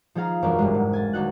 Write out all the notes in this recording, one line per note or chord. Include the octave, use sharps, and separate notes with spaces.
F3 D#4 G#4 F5 A#5
E1 F#2 D4 A#4
F1 G2 G#3
G#2
G#5 A6
D#1 D4 D#4 F#4 F#6